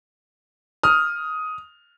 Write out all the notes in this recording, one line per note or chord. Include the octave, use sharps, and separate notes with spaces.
D#6 F6